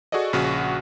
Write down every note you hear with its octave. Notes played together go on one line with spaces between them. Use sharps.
F#4 G#4 A4 D5 D#5
A#1 C#3 F#4 F#5